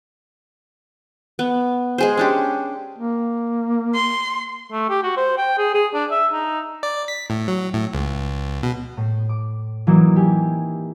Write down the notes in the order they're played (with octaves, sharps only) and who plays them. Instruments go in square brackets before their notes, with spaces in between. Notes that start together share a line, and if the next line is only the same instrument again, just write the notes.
[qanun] B3
G#3 G#4 C5
C#4 D4 G4
[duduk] A#3
[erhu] C6
[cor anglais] A3
G4
F#4
C5
G5
G#4
G#4
D4
E5
D#4
[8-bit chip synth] D5
B6
A2
F#3
A2
C#2
B2
[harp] A2
D6
E3 F#3 A#3 C4 D#4 E4
G4 G#5